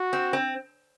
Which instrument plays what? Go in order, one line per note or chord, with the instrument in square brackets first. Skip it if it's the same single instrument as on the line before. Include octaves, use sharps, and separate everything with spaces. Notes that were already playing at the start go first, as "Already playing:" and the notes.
Already playing: [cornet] F#4
[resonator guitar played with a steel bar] C4
C4